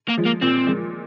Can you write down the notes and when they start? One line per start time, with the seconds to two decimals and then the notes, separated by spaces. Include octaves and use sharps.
0.09 A#3
0.17 F3 G#3
0.26 A#3
0.42 A#2 C4
0.67 F3 G#3